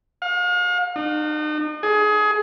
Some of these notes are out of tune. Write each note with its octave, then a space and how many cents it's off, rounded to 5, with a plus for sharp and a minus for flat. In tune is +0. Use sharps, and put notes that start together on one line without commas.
F5 +40
D#4 -40
G#4 +25